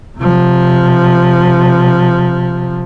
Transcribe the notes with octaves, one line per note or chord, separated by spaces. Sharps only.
C3 F3